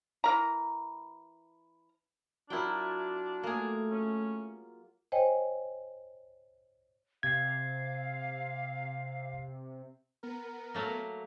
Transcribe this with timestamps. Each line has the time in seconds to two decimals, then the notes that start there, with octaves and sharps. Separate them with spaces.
0.24 E3 A#4 A#5
2.50 F#3 D4 E4 F4 A#4 G5
3.43 A3 A#3 G#4
3.91 C#4
5.12 C5 C#5 D#5 G5 G#5
7.23 C3 F5 G#6
10.23 B3 A#4
10.74 F#3 A3 A#3